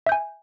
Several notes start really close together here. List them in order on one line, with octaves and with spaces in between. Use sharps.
E5 G6 G#5